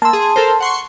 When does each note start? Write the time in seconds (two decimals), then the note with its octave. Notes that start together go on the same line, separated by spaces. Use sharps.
0.02 A#3 A5 C6 E6
0.13 G#4
0.36 A4 A#4 C5
0.60 F#5 C6 C#6